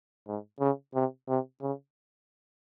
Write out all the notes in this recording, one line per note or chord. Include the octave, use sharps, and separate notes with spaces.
G#2
C#3
C3
C3
C#3